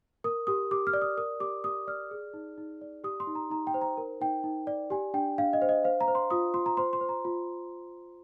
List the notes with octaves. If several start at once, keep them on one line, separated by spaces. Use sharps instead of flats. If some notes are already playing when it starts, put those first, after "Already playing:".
A#4 D#6
G4 D#6
G4 D6
F6
D5
D#6
A#4 D#6
G4 D6
G4 D#6
D5 F6
G#4
D#4
D#4
D5
G4 D#6
C6
D#4
A#5
D#4 A#5
G5
C5
A#5
A#4
D#4 G5
D#4
D5
G4 G#5
D4 G5
D4 F5
D#5
C5
D#5
C5 F5
A#5
C5
C6
F4 D#6
F4 C6
A#5
C5 C6
C6
C5
A#5
F4